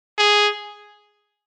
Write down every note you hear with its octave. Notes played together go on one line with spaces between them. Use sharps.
G#4